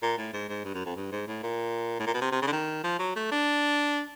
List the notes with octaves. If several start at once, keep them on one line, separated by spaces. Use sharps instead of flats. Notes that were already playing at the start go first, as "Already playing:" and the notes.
A#2
A2
G#2
G#2
G2
F#2
F2
G2
G#2
A2
A#2
A2
A#2
B2
C3
C3
C#3
D3
D#3
F3
F#3
A3
D4